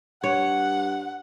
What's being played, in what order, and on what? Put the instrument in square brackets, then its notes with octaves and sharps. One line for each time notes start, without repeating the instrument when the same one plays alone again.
[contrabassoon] G2 [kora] C#5 [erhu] F#5